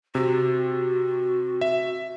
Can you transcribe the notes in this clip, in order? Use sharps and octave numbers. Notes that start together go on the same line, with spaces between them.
C3 F#4
E5